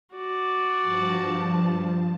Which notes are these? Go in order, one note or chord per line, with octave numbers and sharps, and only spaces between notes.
F#4 D5
G2 F3 A5